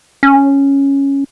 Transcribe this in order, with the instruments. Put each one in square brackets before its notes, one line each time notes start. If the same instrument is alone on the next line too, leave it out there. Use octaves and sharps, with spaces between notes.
[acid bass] C#4